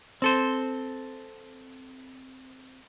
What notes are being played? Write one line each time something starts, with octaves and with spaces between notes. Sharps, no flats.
C4 A4 C5